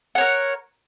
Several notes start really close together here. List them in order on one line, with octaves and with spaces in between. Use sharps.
F#5 C#5 A#4